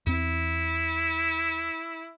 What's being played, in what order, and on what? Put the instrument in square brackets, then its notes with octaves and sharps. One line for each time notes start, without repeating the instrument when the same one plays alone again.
[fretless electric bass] E2 C4 [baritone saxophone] E4